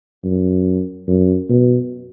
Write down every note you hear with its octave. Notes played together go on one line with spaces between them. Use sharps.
F#2
F#2
B2